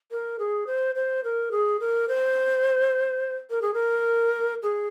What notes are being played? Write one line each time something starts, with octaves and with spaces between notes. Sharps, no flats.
A#4
G#4
C5
C5
A#4
G#4
A#4
C5
A#4
G#4
A#4
G#4